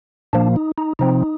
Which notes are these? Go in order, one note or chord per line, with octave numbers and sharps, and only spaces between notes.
A#2 F3 A#3 D4
D#4
D#4
C3 F3 C4 D#4